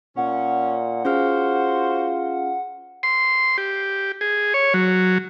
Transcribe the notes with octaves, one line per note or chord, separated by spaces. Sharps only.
A#2 C#4 F#5
C#4 F4 F#4 G#4 C5 F6
C6
G4
G#4
C#5
F#3